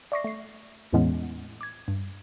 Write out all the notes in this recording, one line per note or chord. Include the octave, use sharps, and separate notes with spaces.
D5 E5 C#6 D6 A#6 C7
A3 C7
E2 A2 E3 G#3 B3 C#4
D6 G#6
G2